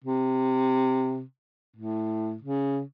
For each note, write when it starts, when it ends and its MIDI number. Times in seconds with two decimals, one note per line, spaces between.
0.04 1.23 48
1.76 2.36 45
2.42 2.81 49